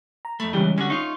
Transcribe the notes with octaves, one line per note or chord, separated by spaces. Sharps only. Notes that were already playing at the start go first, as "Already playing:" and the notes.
A#5
F2 A3 B5
C#2 E3 G3 G#3 C#4
D3 C#4 F#4
D#4 F4 C#6